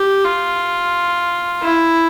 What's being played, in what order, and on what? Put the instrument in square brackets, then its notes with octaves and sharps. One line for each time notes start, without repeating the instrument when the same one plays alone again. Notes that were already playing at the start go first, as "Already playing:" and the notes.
Already playing: [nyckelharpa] G4
F4
E4